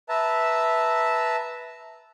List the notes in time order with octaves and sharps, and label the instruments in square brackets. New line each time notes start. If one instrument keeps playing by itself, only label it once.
[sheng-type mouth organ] B4 E5 A5 A#5